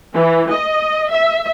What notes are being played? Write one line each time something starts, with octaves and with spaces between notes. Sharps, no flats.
E3
D#5
E5